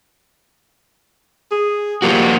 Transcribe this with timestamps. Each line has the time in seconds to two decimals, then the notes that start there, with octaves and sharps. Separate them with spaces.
1.51 G#4
2.02 F3 A#3 F#4 G4